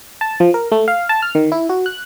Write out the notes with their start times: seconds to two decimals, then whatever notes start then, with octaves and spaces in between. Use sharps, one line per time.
0.21 A5
0.40 F3
0.54 A#4
0.72 A3
0.88 F5
1.09 A5
1.22 F6
1.35 D#3
1.52 E4
1.69 F#4
1.86 F#6